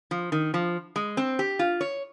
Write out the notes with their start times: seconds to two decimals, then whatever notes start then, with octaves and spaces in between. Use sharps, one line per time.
0.11 F3
0.32 D#3
0.54 F3
0.96 G#3
1.17 C4
1.39 G4
1.59 F4
1.81 C#5